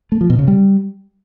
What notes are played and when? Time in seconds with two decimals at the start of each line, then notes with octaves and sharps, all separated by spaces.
0.12 A3
0.21 F3
0.30 B2
0.39 C#3
0.48 G3